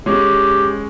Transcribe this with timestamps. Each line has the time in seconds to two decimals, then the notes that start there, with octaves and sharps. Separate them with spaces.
0.06 G#3 C#4 G4